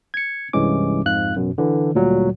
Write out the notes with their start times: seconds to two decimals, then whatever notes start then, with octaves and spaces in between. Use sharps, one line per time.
0.14 G#6 C#7
0.53 C2 G2 E3 G#3 C#4 D6
1.05 F2 G#2 F5 F#6
1.34 A1 F#2 B2
1.58 D3 E3
1.95 D2 A#2 F#3 G3